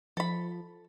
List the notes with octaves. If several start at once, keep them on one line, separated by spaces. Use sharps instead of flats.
F3 A4 B5